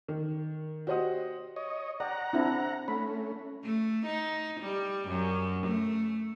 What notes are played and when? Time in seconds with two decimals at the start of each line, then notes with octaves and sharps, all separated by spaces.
0.08 D#3
0.87 F#4 G4 C5 D#5 F#5 D#6
1.56 C#5 D#5
2.00 D5 F#5 G5 A#5
2.33 C4 D4 E4
2.88 A3 C#4 B5
3.63 A3
4.06 D#4
4.60 G3
5.08 F#2
5.67 A3